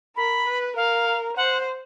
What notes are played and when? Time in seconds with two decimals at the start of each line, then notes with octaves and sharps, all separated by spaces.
0.16 A#4 B5
0.47 B4
0.76 A#4 F5
1.37 C5 F#5